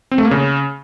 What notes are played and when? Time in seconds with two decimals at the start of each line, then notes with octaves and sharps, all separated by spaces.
0.11 C4
0.18 A3
0.25 A#3
0.31 C#3